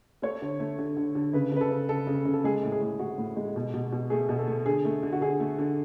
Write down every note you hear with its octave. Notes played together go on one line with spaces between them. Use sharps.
A3 C#5
D3
A3
D3
D3
D3
C#3 B4
C#3 B4
A4
C#3
C#3 A4
C#3
C#3
A4
G#3 G#4
A2
G#4
A2
A2 F#4
A2
G#3
B2
B2
B2
A3 G#4
B2
A4
A3
D3 G#4
A3
D3
F#4
D3 G#4
A3
D3